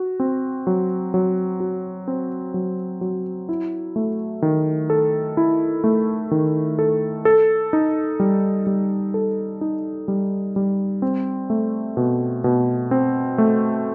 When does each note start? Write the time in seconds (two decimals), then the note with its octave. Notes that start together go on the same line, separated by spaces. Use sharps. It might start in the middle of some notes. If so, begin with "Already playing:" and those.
Already playing: F#4
0.20 C4
0.67 F#3
1.14 F#3
1.60 F#4
2.08 C4
2.54 F#3
3.01 F#3
3.49 E4
3.96 A3
4.42 D#3
4.90 A4
5.37 E4
5.84 A3
6.31 D#3
6.79 A4
7.25 A4
7.73 D#4
8.20 G3
8.67 G3
9.14 A4
9.61 D#4
10.08 G3
10.56 G3
11.02 C4
11.50 A3
11.97 B2
12.44 B2
12.91 C4
13.38 A3